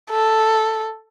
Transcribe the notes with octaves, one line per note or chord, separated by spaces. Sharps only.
A4